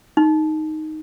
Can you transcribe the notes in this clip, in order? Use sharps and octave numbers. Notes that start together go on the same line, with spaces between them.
D#4